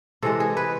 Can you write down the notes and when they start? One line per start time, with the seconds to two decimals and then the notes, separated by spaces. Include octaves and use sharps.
0.22 C3 E3 G#3 A4
0.40 G#4
0.57 B4